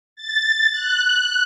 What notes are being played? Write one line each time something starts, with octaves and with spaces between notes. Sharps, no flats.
A6
F#6